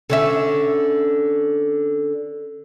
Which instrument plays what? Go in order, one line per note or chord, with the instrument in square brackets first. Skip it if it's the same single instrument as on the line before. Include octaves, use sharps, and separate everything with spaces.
[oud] D3 C#4 E5